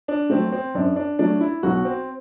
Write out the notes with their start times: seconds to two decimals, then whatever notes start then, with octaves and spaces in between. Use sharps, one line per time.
0.08 D4
0.30 F#3 A3 C4
0.52 C4
0.75 F#2 D4
0.96 D4
1.19 F#3 A3 D4
1.40 E4
1.63 B1 F#4
1.85 C4